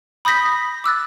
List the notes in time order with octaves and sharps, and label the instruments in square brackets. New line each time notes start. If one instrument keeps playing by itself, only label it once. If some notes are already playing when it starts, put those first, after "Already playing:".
[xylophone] B5 D#6 G6 A#6 B6
D6 E6 F#6 A6